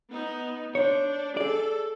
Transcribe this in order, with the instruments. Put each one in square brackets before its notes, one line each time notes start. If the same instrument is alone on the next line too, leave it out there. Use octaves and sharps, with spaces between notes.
[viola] B3 D#4
[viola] D4 [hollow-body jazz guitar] C5 C#5
[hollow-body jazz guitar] G#4 D5 [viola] A4